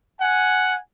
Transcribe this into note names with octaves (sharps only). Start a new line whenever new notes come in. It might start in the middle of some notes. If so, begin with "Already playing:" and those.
F#5 G#5